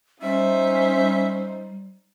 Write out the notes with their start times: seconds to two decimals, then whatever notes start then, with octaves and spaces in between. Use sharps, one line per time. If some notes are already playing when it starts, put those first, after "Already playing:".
0.22 G3 C#4 D#4 C5 E5